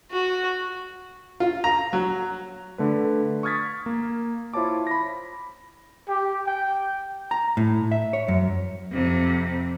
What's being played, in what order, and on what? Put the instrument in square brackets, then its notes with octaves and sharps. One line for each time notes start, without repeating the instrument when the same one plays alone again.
[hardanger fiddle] F#4
[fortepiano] F4
A#5
F#3
[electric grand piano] D3 A3 B4
C#6 D#6 F6 G#6 A6 B6
A#3
E4 F4 C5 C#5 A5 D6
B5 A#6
[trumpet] G4
G5
[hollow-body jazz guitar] A#5
A2
E5
C#5
F#2
[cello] F2 C3